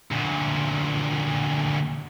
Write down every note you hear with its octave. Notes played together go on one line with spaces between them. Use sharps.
D2 A#2